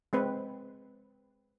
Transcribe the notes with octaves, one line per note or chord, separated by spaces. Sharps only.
G#3 C4 B4